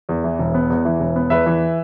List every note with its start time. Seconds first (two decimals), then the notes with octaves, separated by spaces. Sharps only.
0.09 E2
0.24 E3
0.39 E1
0.54 B3
0.70 E2
0.85 E3
1.00 E1
1.16 B3
1.30 E2 B4 E5
1.46 E3